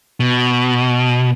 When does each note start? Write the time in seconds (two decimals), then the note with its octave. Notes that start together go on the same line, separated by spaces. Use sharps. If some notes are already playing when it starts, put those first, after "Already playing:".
0.20 B2